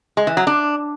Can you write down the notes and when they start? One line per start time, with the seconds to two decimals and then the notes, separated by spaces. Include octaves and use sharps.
0.17 G#3
0.27 E3
0.37 F#3
0.47 D4